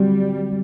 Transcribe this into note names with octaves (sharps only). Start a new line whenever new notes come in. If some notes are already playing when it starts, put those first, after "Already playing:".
Already playing: D3 F#3 G3 C4 F#4